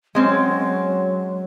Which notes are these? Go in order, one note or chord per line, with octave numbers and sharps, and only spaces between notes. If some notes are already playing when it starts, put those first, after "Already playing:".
F#3 G#3 C4 C#4